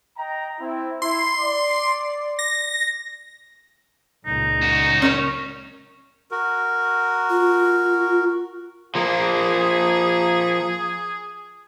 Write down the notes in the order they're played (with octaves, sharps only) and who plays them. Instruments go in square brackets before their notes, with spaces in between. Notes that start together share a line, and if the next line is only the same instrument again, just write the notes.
[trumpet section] D#5 G5 A#5
C4 E4
[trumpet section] E4 [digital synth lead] C6
[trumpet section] D5
[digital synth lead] A#6
[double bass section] C#2 A#2 [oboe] D#4
[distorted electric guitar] F#2 F#4
[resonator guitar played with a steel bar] C#4 A#4 C#5
[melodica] F#4 A#4
[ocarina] F4
[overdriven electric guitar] F3 A#3 [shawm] G#4